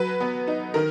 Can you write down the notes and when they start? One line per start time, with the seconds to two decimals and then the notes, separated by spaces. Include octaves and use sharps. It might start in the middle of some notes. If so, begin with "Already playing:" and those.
Already playing: F#3 B4
0.20 B3
0.48 D#4
0.74 D#3 A#4